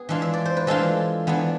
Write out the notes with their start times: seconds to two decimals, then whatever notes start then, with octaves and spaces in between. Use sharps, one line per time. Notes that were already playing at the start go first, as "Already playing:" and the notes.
Already playing: B3 G#4 B4
0.09 E3 G#3 D4 F4
0.22 E5
0.34 D5
0.45 C5
0.57 B4
0.67 E3 G#3 D4 F4 A4
1.27 E3 B3 D4